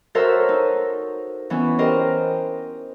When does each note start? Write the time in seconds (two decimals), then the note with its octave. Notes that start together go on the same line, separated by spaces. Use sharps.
0.15 F#4 A4 A#4 C5 C#5 E5
0.49 D#4
1.50 E3 B3 C#4 E4 C#5
1.79 G4 A#4 C5 D#5